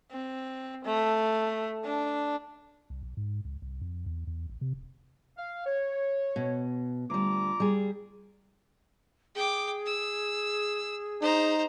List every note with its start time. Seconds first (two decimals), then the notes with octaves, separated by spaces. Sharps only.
0.11 C4
0.85 A3
1.84 D4
2.90 C2
3.03 B1
3.17 G#2
3.45 C#2
3.62 C2
3.82 F2
4.06 E2
4.27 E2
4.49 A1
4.61 C3
4.73 D1
5.37 F5
5.66 C#5
6.36 B2
7.10 D2 G3 F4 A#5 D6
7.60 G3 G#4
9.35 G#4 G5 D6
9.86 E6
11.22 D#4 C5 A#5